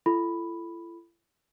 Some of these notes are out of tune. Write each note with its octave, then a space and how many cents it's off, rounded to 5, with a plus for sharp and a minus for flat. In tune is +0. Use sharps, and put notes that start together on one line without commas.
E4 +45 A4 +0 B5 +0